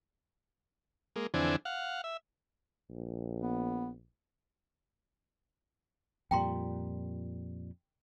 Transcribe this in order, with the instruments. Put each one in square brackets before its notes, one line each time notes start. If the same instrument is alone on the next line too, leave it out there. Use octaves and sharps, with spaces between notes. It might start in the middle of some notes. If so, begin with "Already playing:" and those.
[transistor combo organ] G#3 A#3
F2 D3 E3 C4 D4 G#5
F5 F#5
E5
[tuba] A#1
[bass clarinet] B3
[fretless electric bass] F2 A#2 G3 [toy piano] G5 A#5 C6